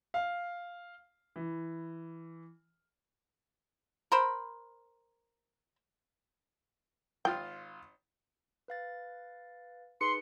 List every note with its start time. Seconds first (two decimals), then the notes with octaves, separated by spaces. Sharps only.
0.14 F5
1.36 E3
4.12 A#4 C5 B5
7.25 G#1 F4 G5 F6
8.68 B4 F5 A6
10.01 D#4 G#4 B4 C6 C#7